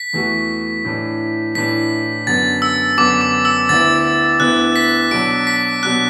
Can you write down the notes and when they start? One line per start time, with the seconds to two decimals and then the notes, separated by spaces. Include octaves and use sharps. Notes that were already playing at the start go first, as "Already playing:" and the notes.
Already playing: B6
0.13 E2 E3 A3 F#4
0.84 A2 E3 D4
1.55 A2 E3 D4 B6
2.27 F#2 D3 B3 D4 A6
2.62 E6
2.97 F#2 D3 B3 D4 D6
3.21 D6
3.45 E6
3.69 D2 D3 B3 E4 A6
4.40 D2 D3 B3 E4 F#6
4.76 B6
5.11 B2 F#3 D4 D7
5.47 B6
5.82 B2 F#3 D4 F#6